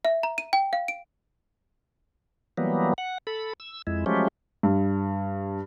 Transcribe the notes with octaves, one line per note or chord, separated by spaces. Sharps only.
E5
A#5
D#7
G5
F5
D7
E3 F#3 G3 A#3 B3
F#5
A4 B5
E6
F2 G#3 E4
F3 F#3 G#3 A3 C#4 G4
G2